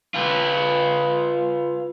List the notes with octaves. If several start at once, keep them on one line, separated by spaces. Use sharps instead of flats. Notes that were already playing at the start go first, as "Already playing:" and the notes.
F4 B4